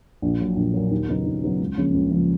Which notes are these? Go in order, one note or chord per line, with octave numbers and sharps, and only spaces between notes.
A#1
A#2 F#3
A#1
A#2 F#3
D#2
C#3 F#3 B3 D#4
D#2
C#3 F#3 B3 D#4
C#2
C#3 F3 A#3 C#4
C#2
C#3 F3 A#3 C#4